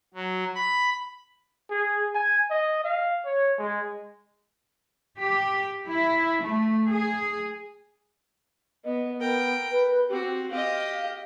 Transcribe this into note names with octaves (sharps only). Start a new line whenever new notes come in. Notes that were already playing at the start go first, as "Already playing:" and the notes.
F#3
B5
G#4
G#5
D#5
F5
C#5
G#3
G4
E4
A3
G#4
B3 D#5
B3 A#4 G5
B4
C4 F#4 G4
G4 D#5 F5